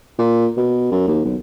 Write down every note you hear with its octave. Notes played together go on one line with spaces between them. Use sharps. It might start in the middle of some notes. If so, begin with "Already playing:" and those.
A#2
B2
F#2
D#2
B1